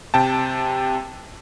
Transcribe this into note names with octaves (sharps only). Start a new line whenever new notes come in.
C3 G5 A5